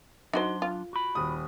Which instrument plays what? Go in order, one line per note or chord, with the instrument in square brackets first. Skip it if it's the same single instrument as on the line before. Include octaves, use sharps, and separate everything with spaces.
[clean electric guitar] F#3 D4 C6 [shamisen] D#4 F#4 C5
[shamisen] F4
[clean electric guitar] F#4 B5
[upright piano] D#1 D#6